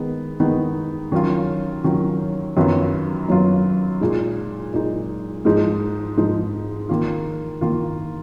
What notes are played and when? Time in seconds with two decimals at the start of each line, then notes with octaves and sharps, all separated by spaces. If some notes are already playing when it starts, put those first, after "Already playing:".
Already playing: D#3 G#3 B3 D#4
0.40 D#3 G#3 B3 D#4
1.12 D#3 F#3 C#4 F4
1.84 D#3 F#3 C#4 F4
2.57 F#2 D#3 F#3 B3 F4
3.29 F#2 D#3 F#3 B3 F4
4.01 A#2 G#3 D#4
4.73 A#2 G#3 D#4
5.45 G#2 F3 G#3 D#4
6.17 G#2 F3 G#3 D#4
6.89 D#3 A#3 F4
7.61 D#3 A#3 F4